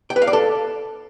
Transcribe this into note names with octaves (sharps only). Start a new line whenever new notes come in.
G5
B4
F5
D5
A4